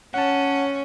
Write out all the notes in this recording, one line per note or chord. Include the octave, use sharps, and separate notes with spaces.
C#4 F#5 A5